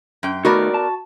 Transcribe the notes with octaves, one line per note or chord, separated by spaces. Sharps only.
F#2 G5
D#3 A3 B3 D#4 F#4 A#4 D5
A5